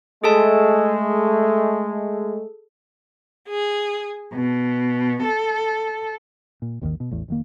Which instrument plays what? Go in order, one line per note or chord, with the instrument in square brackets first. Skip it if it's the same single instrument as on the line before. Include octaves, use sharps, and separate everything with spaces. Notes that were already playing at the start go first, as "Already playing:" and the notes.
[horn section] G#3 A3 [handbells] G#4 A4 A5
[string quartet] G#4
B2
A4
[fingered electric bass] A#2
G#1 D#2 C3 D#3
B2
A1 E2
F1 D#3 A#3